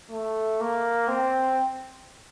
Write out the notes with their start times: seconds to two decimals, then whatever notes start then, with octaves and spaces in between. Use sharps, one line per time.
0.11 A3
0.61 A#3
1.08 C4